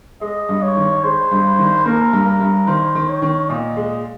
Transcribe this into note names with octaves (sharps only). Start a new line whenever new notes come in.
G#3 D#5
G2
C#5
D#3
G#3 C5
G2
D#3
A#3 A#4
G2
A#4
G2
D#3 C5
D#3
C#5
D#3
A#2 D#5
G#3